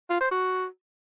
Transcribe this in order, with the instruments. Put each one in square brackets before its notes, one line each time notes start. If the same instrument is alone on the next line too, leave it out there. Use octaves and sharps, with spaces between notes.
[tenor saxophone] F4
C5
F#4